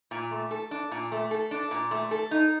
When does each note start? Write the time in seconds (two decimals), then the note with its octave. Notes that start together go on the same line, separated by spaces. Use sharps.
0.11 A#2
0.31 A3
0.51 A4
0.71 D4
0.91 A#2
1.12 A3
1.31 A4
1.51 D4
1.71 A#2
1.91 A3
2.11 A4
2.31 D#4